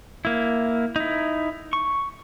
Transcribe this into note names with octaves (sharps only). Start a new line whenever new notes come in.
A#3 E4
D#4 E4
C#6